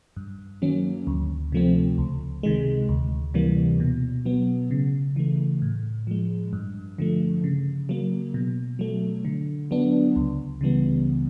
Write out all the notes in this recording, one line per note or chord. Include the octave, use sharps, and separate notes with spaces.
G2
D#3 F#3 A#3 C#4
D2
C3 F3 A3 C4
C#2
C3 D#3 G#3
D2
C3 E3 G3 A#3
B2
F#3 B3
C#3
E3 A3
A2
F3 G#3
G2
D3 F3 A3
C#3
F#3 A#3
B2
F#3 A3
D3
F#3 B3 D4
C#2
C#3 E3 G3 B3